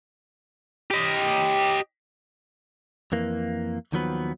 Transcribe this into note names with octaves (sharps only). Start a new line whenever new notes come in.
G4 D#5
F2 E3 A#3
D#2 D#3 F3 F#3 B3 B4